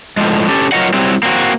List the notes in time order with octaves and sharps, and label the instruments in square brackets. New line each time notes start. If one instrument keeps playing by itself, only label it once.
[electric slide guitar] A2 D3 F3 G#3
C#4 G4 A4
F#3 F4 A#4 C#5 D#5 F#5
F#3 G3 C4 E4
A#3 C4 D4 F#4